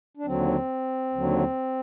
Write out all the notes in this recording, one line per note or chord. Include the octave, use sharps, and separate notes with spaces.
D4
D#2 D3 F#3 C4
D#2 D3 F#3